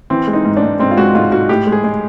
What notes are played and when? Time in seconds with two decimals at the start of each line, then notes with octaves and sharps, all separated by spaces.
0.10 E3 C4
0.27 G#3
0.33 D#4
0.45 G#2
0.57 D4
0.63 G#2
0.79 G#2 C4
0.91 F4
0.97 G#3 F#4
1.15 G#2 F4
1.32 G#2 F#4
1.49 A2 G4
1.67 G#3
1.72 G#4
1.84 G#3